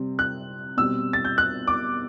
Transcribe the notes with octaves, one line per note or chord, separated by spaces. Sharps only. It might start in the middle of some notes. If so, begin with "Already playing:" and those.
Already playing: C3 G3 C4
F#6
B2 G3 C4 E6
A6
G6
F#6
D6